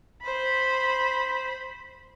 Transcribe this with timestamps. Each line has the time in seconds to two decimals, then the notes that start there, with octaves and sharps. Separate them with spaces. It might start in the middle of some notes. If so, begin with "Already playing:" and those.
0.22 C5 B5